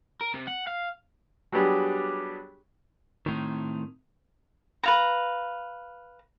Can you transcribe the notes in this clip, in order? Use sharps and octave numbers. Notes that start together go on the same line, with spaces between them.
A#4
C3
F#5
F5
F#3 G3 B3 D4 G4 G#4
A2 D#3 C4 D#4 A#4
B4 F5 A#5